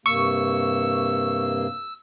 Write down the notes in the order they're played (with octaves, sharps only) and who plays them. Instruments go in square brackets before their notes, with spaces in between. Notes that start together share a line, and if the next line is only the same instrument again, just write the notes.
[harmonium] G2 C3 A#3 [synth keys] C#6 [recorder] E6